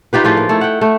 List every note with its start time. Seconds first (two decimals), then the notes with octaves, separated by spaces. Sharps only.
0.13 D#4 F4 G4 B4
0.24 A2 F3 F4 G#4
0.37 A#3
0.49 A3 E4
0.61 F#5 G5
0.81 A3